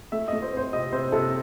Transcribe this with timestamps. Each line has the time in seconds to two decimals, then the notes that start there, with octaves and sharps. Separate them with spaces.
0.12 A3 E5
0.28 D#5
0.33 A3
0.42 C5
0.53 C4 C5
0.73 C3 D#5
0.92 C3 C5
1.12 C3 A4